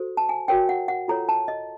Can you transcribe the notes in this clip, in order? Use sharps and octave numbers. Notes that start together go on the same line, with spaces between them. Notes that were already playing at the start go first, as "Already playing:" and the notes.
Already playing: F#4 A4 C5
A5
G#5
F#4 A#4 C#5 G5
F#5
F#5
F4 A4 C#5 A#5
A5
D#5